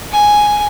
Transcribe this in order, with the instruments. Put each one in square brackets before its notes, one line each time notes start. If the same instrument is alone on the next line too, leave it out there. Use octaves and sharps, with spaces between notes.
[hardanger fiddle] G#5